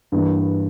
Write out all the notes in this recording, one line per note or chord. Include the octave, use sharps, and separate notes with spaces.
G2 E3 A#3